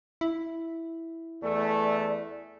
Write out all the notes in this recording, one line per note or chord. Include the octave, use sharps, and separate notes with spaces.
E4
E2 A3 D5